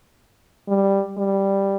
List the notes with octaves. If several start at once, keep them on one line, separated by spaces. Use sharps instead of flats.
G3
G3